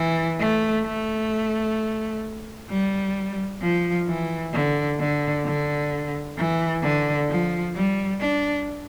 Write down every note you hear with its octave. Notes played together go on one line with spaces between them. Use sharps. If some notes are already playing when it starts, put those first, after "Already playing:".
Already playing: E3
A3
A3
G3
F3
E3
D3
D3
D3
E3
D3
F3
G3
D4